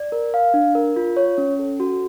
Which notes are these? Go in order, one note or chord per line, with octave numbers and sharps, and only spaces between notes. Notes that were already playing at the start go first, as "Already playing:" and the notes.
Already playing: D5
A#4
F5
D4
A#4
F4
C#5
C#4
A4
F#4